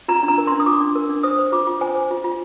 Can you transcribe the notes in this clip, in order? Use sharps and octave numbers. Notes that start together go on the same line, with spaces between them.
F4 A#5
D4
A#5
A#4
D4 C6
D#6
F4 D6
D4
A#4
D4
C5 D#6
C5
F4 D6
F4
C5 G#5
C5
F4
F4